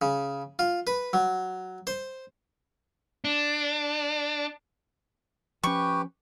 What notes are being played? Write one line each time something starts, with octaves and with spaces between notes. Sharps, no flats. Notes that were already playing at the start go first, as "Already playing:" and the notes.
C#3
F4
B4
F#3
C5
D4
F3 C#4 G4 B4 G5 C#6